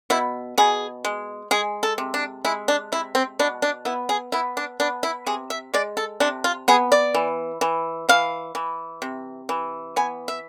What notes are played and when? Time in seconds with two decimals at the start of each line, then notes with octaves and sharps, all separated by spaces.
0.10 B2 E4
0.58 B2 G#4
1.05 G#3
1.51 G#3 G#4
1.83 A4
1.98 C3
2.14 D4
2.45 G#3 E4
2.68 D4
2.92 C3 E4
3.15 C4
3.39 B2 D4
3.62 D4
3.85 B3 E4
4.09 G#4
4.32 B3 E4
4.57 D4
4.80 B3 D4
5.03 E4
5.26 C3 G#4
5.50 E5
5.74 G#3 D5
5.97 A4
6.20 C3 D4
6.44 F4
6.68 B3 G#4
6.92 D5
7.14 E3
7.61 E3
8.09 E3 F5
8.55 E3
9.02 C3
9.49 E3
9.96 B3 G#5
10.28 E5